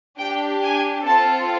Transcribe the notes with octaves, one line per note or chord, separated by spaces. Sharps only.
D4 G4 G5
G#5
C4 F4 A4 A5